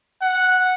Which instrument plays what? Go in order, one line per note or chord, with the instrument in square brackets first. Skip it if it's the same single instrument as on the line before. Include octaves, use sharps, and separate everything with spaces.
[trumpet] F#5